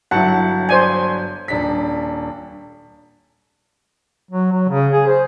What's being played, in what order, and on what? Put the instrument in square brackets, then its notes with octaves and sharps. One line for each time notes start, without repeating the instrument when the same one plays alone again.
[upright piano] G1 F#3 A5 [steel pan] E4 F#5
[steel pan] C5 D5 G#5
[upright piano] D#1 D4 B6
[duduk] F#3
F#3
C#3
G#4
C5